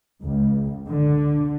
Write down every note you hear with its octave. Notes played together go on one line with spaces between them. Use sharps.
C#2
D3